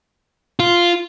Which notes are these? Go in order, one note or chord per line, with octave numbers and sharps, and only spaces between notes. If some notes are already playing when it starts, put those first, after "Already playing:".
F4